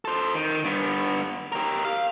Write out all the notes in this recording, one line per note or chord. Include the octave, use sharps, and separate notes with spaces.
A4 C5
D#3
G2 B3
G4 A#4
F5